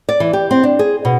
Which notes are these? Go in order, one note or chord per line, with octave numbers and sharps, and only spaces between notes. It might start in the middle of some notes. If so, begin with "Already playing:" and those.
D5
E3
G4
C4
D4
G#4
B2